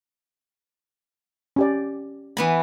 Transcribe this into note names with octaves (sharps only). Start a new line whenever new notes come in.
C#4 G4 D5
E3 B3 B5